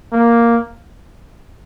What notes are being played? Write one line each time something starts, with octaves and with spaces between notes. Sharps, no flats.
A#3